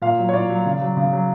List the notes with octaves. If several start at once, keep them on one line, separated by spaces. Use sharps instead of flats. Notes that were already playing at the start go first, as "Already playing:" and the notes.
A#2 F5
F#3
C#5
A#2 D5
F#3
C#3
F#3
C#3
F#3